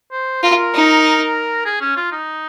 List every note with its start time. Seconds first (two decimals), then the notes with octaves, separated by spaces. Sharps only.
0.12 C5
0.43 F4 A#4
0.74 D#4
1.66 G#4
1.81 C#4
1.97 F4
2.12 D#4